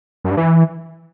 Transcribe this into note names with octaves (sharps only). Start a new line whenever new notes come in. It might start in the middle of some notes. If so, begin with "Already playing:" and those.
F#2
G2
E3